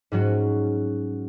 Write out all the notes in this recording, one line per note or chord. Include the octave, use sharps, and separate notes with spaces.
G#2 F#3 C#4 F#4